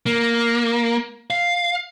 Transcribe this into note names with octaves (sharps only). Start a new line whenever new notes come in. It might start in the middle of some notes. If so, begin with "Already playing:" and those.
A#3
F5